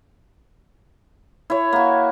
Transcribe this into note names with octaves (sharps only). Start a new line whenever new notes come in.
E4 C#5
A#3 F#4